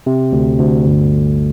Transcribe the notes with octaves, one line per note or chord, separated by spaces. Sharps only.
C3
D2
D2
G1